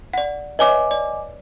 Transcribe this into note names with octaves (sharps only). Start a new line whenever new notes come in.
D5 F#5
B4 C#5 D#5 E5 G#5 D6
D5